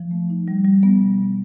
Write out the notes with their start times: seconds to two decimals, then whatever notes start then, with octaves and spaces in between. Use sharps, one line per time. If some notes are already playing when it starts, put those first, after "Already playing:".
Already playing: F3
0.11 A3
0.30 D#4
0.48 G3
0.64 G3
0.83 B3
1.00 B2
1.18 B3